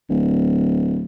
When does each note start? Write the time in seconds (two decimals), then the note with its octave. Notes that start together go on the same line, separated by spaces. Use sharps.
0.09 D1